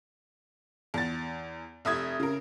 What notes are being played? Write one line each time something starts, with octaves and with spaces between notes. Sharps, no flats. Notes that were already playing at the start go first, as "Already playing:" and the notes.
E2 A6
F1 E5 D#6 G#6
C#3 A#4